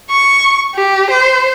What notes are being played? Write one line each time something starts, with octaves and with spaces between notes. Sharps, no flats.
C#6
G4
C5